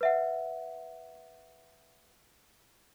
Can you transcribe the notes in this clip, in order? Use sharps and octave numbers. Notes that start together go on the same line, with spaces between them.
B4 E5 F#5